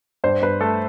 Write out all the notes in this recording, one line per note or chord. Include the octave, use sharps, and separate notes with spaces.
G2 C5
G2 B4
A3 A4